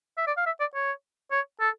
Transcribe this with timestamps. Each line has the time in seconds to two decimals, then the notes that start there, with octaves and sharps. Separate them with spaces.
0.17 E5
0.27 D5
0.37 F5
0.46 E5
0.60 D5
0.75 C#5
1.31 C#5
1.60 A4